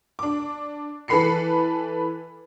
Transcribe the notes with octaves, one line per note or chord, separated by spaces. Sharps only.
D4 D6
E3 A4 B4 B5 C7 C#7